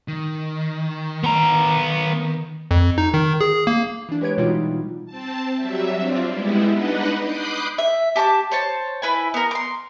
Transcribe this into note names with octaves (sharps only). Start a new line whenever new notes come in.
D#3
B3 A#5
F2
D#4
D#3
G#4
A#3
E3 D4
G#3 G4 B4 C#5 G#6 D7
B2 E3 G3 D#4 F4 F#4
C4 A5
F#3 G3 E5
C4 D4 F4
G3 G#3 B3 E4
D4 D#4 B4 D#5 F#5
B5 D6 D#6 F#6 G6 C7
E5
G4 A5 A#5 D6
C5 C#5 A5
E4 B4 G#5
B3 A#4
C6 D6